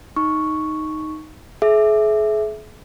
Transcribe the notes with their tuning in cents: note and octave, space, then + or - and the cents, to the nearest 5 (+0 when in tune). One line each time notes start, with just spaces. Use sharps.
D#4 +0 C#6 +0
G#4 +40 E5 +0